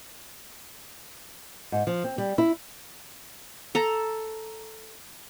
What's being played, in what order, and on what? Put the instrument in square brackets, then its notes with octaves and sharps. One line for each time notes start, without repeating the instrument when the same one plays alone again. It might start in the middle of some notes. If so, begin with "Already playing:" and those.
[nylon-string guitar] G#2
F3
C4
G3
E4
[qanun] A4 A#5